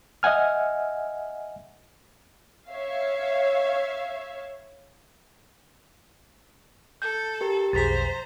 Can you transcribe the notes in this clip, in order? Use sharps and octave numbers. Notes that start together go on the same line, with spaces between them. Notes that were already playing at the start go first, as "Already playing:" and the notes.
D#5 E5 F#5 G#5 F6
C#5 E5 F5
A4 G6
G4 A#4
B1 F2 G#4 C5 A#5 A6 B6